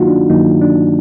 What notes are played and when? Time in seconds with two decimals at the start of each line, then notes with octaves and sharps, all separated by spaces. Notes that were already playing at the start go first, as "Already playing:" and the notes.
Already playing: G2 D#3 F#3 A#3 D#4 F4 F#4
0.08 D4
0.30 G2 D#3 F#3 A#3 D#4
0.61 D4